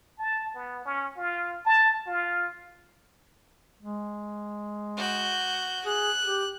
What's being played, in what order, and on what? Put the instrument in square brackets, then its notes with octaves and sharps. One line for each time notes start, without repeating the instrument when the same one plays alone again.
[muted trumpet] A5
B3
C#4
F4
A5
F4
[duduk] G#3
[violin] F#4 G6
[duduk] G#4 [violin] F#6
[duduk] G4